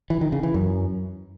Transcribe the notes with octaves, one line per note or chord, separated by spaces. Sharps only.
E3
D#3
C#3
E3
F#2